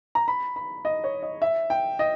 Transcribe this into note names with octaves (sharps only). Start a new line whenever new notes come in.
A#5
B5
B5
D#5
C#5
D#5
E5
G5
D#5